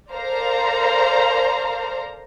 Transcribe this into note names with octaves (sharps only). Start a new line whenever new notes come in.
A4 A#4 C5 D5 F5 A#5